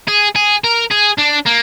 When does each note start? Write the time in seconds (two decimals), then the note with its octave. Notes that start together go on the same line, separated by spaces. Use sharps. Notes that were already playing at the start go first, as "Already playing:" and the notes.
0.08 G#4
0.36 G#4
0.64 A#4
0.91 G#4
1.19 D4
1.46 A#3